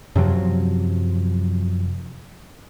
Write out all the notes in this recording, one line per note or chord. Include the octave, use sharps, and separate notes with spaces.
F#2 C3 F3 F#3